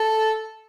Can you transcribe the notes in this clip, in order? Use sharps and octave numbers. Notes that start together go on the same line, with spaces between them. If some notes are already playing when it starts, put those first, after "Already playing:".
Already playing: A4